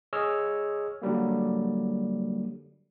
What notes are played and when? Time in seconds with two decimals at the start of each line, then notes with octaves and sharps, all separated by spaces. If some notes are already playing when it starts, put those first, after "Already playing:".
0.13 G#4 C#5 D#5 E6 F6
1.02 D3 F#3 G3 A#3